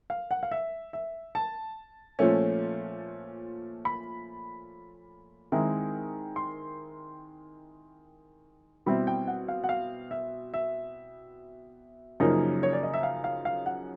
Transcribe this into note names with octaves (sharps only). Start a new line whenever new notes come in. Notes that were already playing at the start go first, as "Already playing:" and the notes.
F5
F#5
F5
E5
E5
A5
A#2 F3 A3 C#4
B5
D#3 G#3 C4 E4
C6
B2 G3 C4 E4 B5
G5
F#5
F5
F#5
F5
E5
E5
F#2 C#3 F3 A#3 D#4
C#5
D5
D#5
E5
F5
F5
F5
F#5